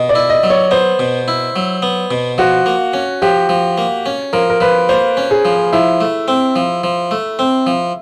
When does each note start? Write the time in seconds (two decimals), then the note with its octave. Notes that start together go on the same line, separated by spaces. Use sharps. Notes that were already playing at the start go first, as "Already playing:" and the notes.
Already playing: B2 D#5
0.09 D5
0.15 E4
0.30 D#5
0.43 F#3
0.50 C#5
0.71 B3 C5
0.99 B2
1.28 E4
1.56 F#3
1.82 B3
2.11 B2
2.38 F3 F#4
2.66 A#3
2.94 C#4
3.22 F3 G4
3.49 F3
3.78 A#3
4.06 C#4
4.33 F3 A#4
4.50 A#4
4.60 F3 B4
4.89 A#3 C5
5.17 C#4
5.31 G#4
5.45 F3
5.72 F3 E4
6.01 A3
6.28 C4
6.56 F3
6.84 F3
7.11 A3
7.39 C4
7.67 F3